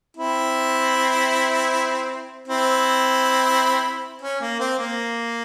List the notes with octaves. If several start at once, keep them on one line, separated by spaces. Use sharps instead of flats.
C4 E4
C4 E4
C#4
A#3
C4
A#3